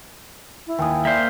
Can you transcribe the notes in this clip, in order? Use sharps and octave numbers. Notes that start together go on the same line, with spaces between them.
E4
D#2 G5 G#5 D#6
A#3 C5 D5 E5 B6